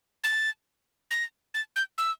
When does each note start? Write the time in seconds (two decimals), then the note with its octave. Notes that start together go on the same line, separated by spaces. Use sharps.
0.24 A6
1.11 A#6
1.54 A6
1.76 G6
1.98 E6